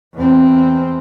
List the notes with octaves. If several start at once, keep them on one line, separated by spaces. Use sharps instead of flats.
E2 C4